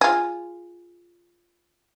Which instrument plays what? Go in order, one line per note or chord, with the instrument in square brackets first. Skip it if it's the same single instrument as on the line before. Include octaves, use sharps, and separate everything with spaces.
[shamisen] F4 G#4